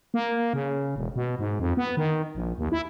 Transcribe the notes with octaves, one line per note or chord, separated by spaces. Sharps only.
A#3
C#3
E1
B2
G#2
F2
B3
D#3
A#1
D#2
E4